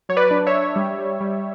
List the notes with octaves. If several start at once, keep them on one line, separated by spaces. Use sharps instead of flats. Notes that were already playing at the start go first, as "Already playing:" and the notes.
F#3 C#5
B4 D5
D4
C#5 E5
D4
G3
G3
G3